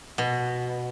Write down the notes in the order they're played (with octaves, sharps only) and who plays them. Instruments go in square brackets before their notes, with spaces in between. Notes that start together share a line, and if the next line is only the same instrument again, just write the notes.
[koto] B2